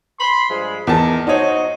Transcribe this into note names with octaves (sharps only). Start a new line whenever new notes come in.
B5 C6
G2 F3 G#3
E2 D#3 A#4 A5
D#4 F#4 C5 C#5 D#5